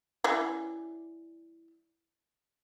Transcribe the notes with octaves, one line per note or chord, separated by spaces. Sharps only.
E3 G3 C#4